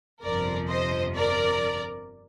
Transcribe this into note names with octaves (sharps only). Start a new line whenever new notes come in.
G1 F2 C3 F3 A#4 D5
C5 D#5
A#4 D5